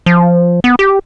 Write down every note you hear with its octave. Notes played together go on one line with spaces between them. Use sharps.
F3
B3
G4